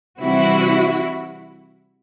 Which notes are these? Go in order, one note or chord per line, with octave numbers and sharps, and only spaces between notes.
C3 E3 G3 C4 E4 F#4